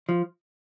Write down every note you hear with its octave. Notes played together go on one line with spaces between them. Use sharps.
F3